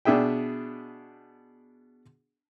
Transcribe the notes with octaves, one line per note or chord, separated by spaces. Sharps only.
B2 D4 G#4 E5 G5